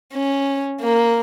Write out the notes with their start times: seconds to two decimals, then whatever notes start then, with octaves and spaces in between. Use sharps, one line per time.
0.13 C#4
0.81 A#3